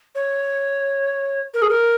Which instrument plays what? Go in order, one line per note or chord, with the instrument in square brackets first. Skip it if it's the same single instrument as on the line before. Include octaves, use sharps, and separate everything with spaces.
[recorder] C#5
A#4
G#4
A#4